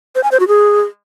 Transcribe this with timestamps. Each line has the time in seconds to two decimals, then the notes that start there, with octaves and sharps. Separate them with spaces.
0.15 C5
0.23 G#5
0.32 C5
0.40 F#4
0.48 G#4